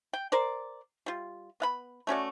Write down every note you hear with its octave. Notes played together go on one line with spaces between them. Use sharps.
G5
A#4 C5 D5
G3 F4
B3 F5 B5
A3 C#4 F#4 D5